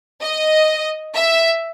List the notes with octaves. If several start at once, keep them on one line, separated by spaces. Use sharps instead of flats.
D#5
E5